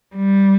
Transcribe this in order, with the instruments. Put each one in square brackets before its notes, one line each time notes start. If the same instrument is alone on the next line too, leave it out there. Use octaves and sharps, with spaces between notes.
[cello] G3